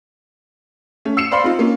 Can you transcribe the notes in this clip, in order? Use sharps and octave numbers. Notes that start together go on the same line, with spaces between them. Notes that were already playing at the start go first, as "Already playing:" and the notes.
A3 C#4
E6 C7 C#7 E7
C5 D5 F5 B5 C6
C4 D#4 F4
A#3 C#4 F4